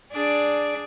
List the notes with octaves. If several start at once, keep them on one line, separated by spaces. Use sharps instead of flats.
D4 G#4 D5